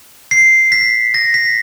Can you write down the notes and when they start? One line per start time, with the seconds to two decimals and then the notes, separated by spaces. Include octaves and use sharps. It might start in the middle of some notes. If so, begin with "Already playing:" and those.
0.31 C7
0.72 B6
1.14 A#6
1.34 B6